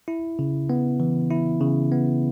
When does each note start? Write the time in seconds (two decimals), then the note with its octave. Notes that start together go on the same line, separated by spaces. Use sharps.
0.08 E4
0.39 C#3
0.70 B3
1.00 E3
1.30 E4
1.61 C#3
1.92 B3